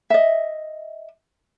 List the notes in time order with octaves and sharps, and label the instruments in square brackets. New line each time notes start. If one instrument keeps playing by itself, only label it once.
[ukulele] D#5 E5